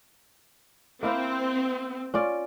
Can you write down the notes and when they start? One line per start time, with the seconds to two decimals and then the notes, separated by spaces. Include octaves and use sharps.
1.03 A#3 C4 E4 F5
2.14 C#4 F4 D5